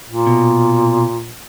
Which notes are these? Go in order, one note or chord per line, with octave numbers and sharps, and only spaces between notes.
A#2
B2